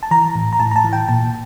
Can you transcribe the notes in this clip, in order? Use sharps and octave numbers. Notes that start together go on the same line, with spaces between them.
A5
E3 A#5
A2
A#5
A2 A5
A#5
A5
E3
G5
A#2 A5